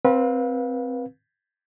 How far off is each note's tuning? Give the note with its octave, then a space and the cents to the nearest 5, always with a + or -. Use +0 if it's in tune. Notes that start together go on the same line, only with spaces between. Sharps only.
C4 +0 B4 -25 F5 +25